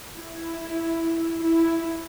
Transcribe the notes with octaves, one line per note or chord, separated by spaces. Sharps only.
E4
E4